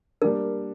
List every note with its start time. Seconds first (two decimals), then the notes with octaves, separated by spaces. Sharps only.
0.22 G3 A#3 D4 A#4